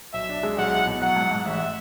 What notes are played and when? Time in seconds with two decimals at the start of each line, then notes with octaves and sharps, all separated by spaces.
0.14 B1 E5
0.29 D4
0.43 G#3
0.58 B1 F#5
0.72 E4
0.87 B2
1.02 F#3 F#5
1.16 G#2
1.31 G#2
1.45 A1 E5